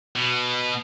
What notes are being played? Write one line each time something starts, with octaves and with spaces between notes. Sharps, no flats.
B2 B3